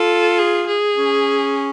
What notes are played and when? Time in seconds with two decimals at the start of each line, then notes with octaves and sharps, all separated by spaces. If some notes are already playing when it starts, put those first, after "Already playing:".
Already playing: F4 A4
0.39 G#4
0.67 G#4
0.96 C#4